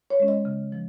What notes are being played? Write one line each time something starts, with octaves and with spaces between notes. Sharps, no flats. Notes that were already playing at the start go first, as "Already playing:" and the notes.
C#5
G#3 C#4
D#5
C#3
F3